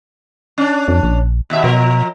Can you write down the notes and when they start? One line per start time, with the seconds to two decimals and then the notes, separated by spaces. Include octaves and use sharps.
0.58 C#4 D4
0.88 F2
1.03 A#1
1.50 D#2 B2 E5
1.64 B2 F3 A#4